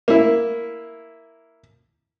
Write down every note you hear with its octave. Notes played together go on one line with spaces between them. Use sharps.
A#3 E4